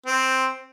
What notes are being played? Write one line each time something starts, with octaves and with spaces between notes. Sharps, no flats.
C4